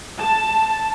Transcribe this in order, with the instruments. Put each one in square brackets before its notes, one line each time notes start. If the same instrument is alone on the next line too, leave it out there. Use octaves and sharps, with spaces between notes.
[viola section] A5